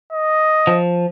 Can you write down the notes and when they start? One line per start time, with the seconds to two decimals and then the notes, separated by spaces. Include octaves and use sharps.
0.12 D#5
0.67 F3